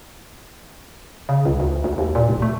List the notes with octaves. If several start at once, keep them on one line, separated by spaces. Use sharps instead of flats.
C#3
C#2
D2
D2
D#2
A#2
F1
A3